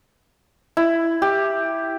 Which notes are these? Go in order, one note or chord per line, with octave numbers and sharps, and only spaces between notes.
E4
G4